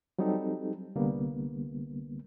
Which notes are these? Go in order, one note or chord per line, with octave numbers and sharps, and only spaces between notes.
F#3 G3 C4 D#4 G4 A4
C2 D3 G3 A#3 B3